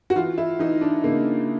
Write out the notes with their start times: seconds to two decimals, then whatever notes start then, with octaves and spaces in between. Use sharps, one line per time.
0.10 F#4
0.16 E3 F4
0.38 E4
0.59 E3 D#4
0.81 D4
1.04 C#3 A#3